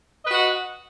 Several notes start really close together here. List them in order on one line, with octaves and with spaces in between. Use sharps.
D#5 B4 F#4 F#5